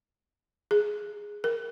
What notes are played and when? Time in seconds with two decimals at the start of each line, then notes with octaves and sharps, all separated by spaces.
0.71 G#4
1.44 A#4